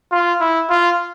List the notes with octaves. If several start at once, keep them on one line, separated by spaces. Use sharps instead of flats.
F4
E4
F4